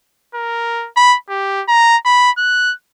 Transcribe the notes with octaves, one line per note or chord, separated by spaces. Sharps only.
A#4
B5
G4
A#5
B5
F#6